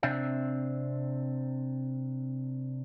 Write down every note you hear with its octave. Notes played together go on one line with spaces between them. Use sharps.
C3 C4 D4 E5